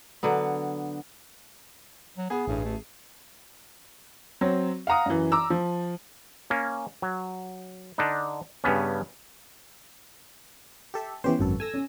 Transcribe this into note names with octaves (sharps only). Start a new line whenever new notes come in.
D3 F#3 B3
F#3
B3 G#4
A1 G2
A3
F#3 C4
F5 F#5 A#5 D#6
F#2 E3
A#5 D6 E6
F3
A#3 C#4
F#3
D3 D4 D#4
G2 C#3 B3 C#4
G4 A4 E5
E3 B3 C#4 G4 C5
G#1 F#2 A4
A4 G#5 E6 A#6
C#4